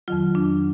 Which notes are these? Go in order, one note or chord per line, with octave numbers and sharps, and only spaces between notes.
F2 D#3 F#3 F4
D4